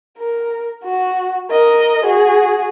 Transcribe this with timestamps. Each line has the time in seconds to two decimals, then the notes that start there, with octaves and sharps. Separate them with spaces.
0.18 A#4
0.84 F#4
1.51 A#4 D#5
2.04 F#4 G#4